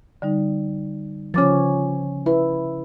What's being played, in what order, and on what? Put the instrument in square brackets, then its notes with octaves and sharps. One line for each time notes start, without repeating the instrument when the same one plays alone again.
[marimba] D3 G3 D#4
[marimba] C#3 D6 A6 [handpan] F3 C#4
[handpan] E4 [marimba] B4